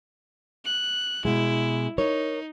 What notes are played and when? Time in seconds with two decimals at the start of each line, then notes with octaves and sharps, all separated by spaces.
0.65 F#6
1.25 B2 G#3 E4
1.98 D#4 A#4 C#5